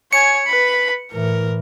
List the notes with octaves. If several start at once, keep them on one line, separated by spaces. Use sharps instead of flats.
C#5 G#5 C#7
B4 B5
A2 E3 A#4